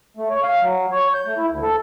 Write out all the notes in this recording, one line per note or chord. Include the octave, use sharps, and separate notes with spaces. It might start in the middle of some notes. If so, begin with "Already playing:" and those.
A3
C#5
F5
F#3
C#5
G6
A3
E4
D2
A4